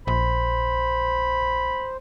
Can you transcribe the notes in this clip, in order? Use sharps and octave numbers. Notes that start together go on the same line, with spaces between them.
A#1 C5 B5